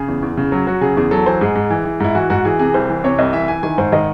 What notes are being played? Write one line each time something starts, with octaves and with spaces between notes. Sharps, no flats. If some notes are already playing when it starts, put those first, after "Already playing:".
Already playing: C#3 G#4
E2
E2
C#3
F#3
F#3 F#4
C#3 G#4
E2 G#4
F#3 A4
E3 C5
G#2 G#4
G#2
E3
E3
G#2 E4
E3 F#4
G#2 F#4
E3 G#4
C3 G#4
C2 C5
E3
C3 C#5
C2 D#5
E3 E5
E3 G#5
D#3 G#5
G#2 C5
D#3 D#5